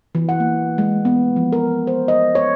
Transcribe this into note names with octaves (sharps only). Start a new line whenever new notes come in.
E3
F#5
A#3
G#3
B3
F3
A#4
C5
D#5
C#5